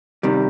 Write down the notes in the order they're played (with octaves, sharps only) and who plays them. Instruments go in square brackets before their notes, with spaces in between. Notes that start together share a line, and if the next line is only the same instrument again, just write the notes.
[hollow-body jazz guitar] C3 D#3 G3